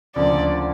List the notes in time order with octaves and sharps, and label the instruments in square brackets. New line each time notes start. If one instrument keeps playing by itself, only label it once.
[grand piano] D2 C#3 F3 A#3 [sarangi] D5